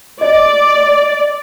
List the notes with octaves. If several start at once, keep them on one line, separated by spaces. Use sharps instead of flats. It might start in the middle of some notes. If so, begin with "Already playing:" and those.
D5 D#5